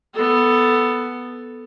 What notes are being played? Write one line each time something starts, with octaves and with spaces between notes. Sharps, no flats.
B3 A4